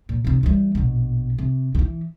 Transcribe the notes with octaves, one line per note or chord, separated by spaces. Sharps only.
A#2
C3 D#3
E3 G3
A#1 B2
C3
D#3 E3